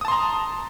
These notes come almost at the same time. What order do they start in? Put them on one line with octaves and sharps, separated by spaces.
D#6 A5 C6 A#5